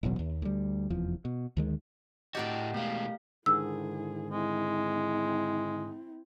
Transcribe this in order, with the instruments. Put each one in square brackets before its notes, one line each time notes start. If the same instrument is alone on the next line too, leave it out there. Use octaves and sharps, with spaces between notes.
[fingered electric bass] D#1 A1 B2 F#3
D#2
D2 G3
F1 E2 F3
B2
D2 D#3 G#3
[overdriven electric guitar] A2 F#4 [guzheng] G4 A#4 D5 [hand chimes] D#5 F#5
[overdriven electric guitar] B2 G#3 [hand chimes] A3 F5
[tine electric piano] G#2 D3 D#3 [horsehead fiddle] E4 G#4 [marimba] E6
[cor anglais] G#3 [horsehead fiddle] C4 E4